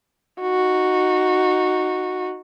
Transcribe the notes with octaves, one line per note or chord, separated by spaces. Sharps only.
D#4 F#4